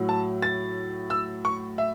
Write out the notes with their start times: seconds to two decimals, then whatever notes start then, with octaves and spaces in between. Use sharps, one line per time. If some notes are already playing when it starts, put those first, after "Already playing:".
Already playing: A2 F#3
0.09 A5
0.42 A6
1.10 E6
1.45 C#6
1.78 E5